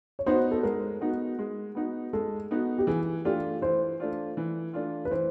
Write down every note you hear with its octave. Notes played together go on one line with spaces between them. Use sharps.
C#5
B3 D#4 F#4 C5
A4
G#3 A#4
B3 D#4 F#4
G#3
B3 D#4 F#4
G#3 A4
B3 D#4 F#4
G4
E3 G#4
A3 D4 F4 G4
E3 C5
A3 D4 F4
E3
A3 D4 F4
B4
E3 C5